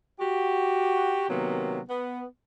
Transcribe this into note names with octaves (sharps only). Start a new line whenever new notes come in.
F#4 G4
C3 D#3 F#3 A#3 B3
B3